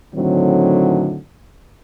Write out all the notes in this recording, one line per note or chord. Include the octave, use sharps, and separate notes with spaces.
A2 D3 D#3 F#3 C4